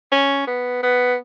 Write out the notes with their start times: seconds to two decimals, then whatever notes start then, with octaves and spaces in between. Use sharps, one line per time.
0.12 C#4
0.47 B3
0.83 B3